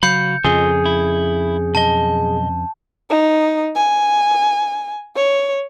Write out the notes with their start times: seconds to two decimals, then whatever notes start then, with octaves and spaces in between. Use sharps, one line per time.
0.03 C#3 F#3 F5 B5 G6 C#7
0.44 F2 C#3 F4 G#4 A4 D#5
0.86 E4
1.75 B1 D#5 A5
3.10 D#4
3.76 G#5
5.16 C#5